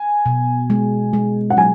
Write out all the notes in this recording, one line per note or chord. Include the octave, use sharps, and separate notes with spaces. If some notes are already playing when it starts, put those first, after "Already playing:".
Already playing: G#5
B2
G#3
G#3
F#5
F#3 G#5